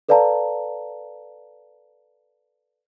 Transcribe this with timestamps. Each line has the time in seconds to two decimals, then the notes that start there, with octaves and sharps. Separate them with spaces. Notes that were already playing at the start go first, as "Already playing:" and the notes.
0.09 A4 B4 D5 F5 A5 A#5